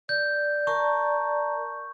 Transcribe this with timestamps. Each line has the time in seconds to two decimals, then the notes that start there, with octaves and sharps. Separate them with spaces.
0.09 D5 G6
0.67 A#4 A5 A#5 C#6